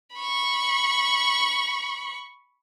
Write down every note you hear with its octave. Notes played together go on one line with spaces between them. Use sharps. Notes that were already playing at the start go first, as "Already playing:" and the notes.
B5 C#6